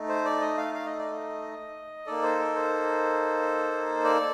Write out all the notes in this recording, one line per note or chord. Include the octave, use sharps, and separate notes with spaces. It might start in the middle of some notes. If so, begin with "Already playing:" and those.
Already playing: A3 D#4
C5
D5
D#5
F5
F5
D#5
D5
D#5
A#3 D#4 A4 D5
C5
A#4
C5
D5